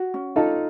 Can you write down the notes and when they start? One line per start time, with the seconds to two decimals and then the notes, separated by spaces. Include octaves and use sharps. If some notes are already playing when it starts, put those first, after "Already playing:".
Already playing: F#4
0.14 C#4
0.36 D#4 F4 A4